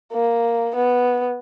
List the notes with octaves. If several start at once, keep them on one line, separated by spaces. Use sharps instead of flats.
A#3
B3